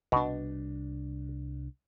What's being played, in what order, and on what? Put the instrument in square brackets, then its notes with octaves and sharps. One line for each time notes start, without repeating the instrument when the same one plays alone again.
[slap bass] C2 D4 [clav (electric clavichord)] B2